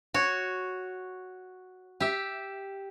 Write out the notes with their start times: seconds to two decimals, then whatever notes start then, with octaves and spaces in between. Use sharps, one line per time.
0.14 F#4 C#5
2.00 G4 E5